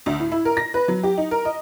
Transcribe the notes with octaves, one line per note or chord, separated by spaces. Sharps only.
D2
A2
E4
A#4
A#6
B4
F#3
G4
D#4
A#4
D#5